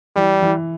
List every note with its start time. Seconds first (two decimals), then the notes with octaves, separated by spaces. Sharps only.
0.16 E3 G3
0.42 E3